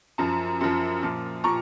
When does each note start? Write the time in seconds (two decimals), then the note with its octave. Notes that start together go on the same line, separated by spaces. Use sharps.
0.18 F#2 F3
0.61 F#2 F3
1.03 A#2 F3
1.44 A#2 A#5 C#6